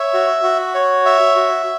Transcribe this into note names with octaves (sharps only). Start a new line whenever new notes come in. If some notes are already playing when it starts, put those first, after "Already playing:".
Already playing: C#5 E5
F#4
F#4
C#5
E5
F#4